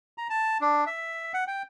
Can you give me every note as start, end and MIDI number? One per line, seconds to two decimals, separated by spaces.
0.18 0.28 82
0.30 0.58 81
0.61 0.85 62
0.87 1.32 76
1.34 1.44 78
1.47 1.63 79